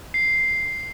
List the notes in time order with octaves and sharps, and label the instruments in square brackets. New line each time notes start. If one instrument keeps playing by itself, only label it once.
[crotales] C7